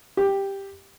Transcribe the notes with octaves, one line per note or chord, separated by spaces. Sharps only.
G4